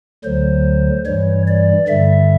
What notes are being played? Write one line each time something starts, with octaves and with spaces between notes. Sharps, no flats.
D2 D3 F#3 C5
G2 E3 G3 C#5
D5
G2 D3 G3 E5